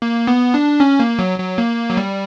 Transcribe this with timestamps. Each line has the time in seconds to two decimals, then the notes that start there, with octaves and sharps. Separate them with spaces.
0.02 A#3
0.27 B3
0.54 D4
0.80 C#4
1.00 A#3
1.19 F#3
1.39 F#3
1.58 A#3
1.90 F#3
1.97 G3